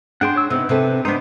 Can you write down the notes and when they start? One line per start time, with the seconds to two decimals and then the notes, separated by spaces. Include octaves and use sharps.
0.21 D4 G#4 F#5 G5 C6
0.36 C#5 E6
0.50 C3 B3 D#4 B4
0.69 C3 A4
1.05 B3 D4 D#4 C5